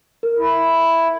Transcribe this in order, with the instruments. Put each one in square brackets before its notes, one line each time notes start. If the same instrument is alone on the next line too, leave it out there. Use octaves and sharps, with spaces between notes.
[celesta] A#4
[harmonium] E4